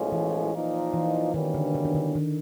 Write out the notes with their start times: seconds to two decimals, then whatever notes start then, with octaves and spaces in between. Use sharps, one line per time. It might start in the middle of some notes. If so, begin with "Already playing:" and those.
Already playing: B1 A2 F3 G#3 C#4
0.12 E3
0.53 A#2 F3 A#3 D#4
0.94 E3
1.34 E2 B2 D#3 G3 A#3 C#4
1.54 D3
1.75 D3
1.85 D#3
1.95 D3
2.15 D#3